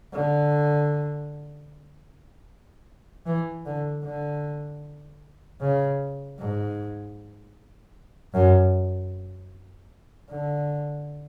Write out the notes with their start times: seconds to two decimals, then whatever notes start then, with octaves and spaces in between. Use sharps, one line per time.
0.13 D3
3.26 E3
3.65 D3
4.04 D3
5.61 C#3
6.38 G#2
8.34 F#2
10.30 D3